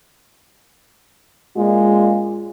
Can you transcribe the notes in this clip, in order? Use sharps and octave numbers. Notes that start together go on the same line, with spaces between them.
A#2 G#3 C#4 F4